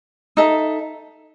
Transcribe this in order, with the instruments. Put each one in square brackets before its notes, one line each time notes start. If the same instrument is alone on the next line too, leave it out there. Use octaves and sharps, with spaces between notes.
[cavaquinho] D#4 A4 E5